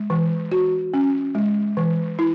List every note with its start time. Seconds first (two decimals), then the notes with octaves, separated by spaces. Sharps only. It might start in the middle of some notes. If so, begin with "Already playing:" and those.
Already playing: G#3
0.10 E3
0.52 F#4
0.94 C#4
1.35 G#3
1.77 E3
2.19 E4